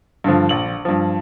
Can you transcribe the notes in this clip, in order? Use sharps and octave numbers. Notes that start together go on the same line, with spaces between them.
G2 D3 F3
A#1 F#7
G2 F3